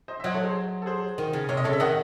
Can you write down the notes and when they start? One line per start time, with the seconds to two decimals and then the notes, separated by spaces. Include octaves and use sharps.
0.08 C5 D#5
0.20 E5
0.24 F#3 C5 D#5
0.34 A4 C#5
0.44 G#4 C5
0.82 A4
0.86 G#4 C5
1.18 D#3
1.33 C#3
1.49 C3 C#5
1.57 D#5
1.64 C#3 A4 C#5
1.73 E5
1.80 D#3 D#5 F#5